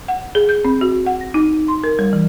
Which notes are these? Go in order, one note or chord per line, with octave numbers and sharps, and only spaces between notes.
F#5
G#4
G6
C4
F#4
F#5
A#6
D#4
C6
A#4
G3
E3